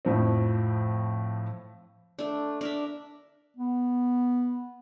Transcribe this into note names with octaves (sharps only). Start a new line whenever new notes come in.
F2 A2 F3 C4
A3 D4
D4 A#4 E5
B3